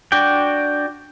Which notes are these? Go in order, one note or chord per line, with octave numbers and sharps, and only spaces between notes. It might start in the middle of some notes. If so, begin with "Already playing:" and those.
D4 F#4 D5 G5